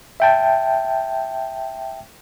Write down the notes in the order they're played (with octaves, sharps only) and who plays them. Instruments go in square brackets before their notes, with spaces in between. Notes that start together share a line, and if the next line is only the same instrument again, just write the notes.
[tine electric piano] E5 G5 A5